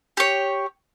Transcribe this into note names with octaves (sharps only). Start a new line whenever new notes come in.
G4 C#5